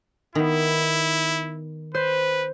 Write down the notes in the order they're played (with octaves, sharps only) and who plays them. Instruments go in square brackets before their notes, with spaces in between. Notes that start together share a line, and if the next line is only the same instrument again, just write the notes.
[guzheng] D#3 B3 [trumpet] E4
[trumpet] B4 [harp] C5